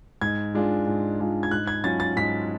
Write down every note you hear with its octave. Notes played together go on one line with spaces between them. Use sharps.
G#2 G#6
G#3 D4 F4
G#2
G#3 D4 F4
G#6
G#2 F#6
G#6
F#3 C#4 F4 A6
A6
G#2 B6